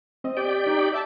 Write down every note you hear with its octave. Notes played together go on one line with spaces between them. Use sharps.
C4 D#5
G4 D5 G5
D#4
D5 E5 A5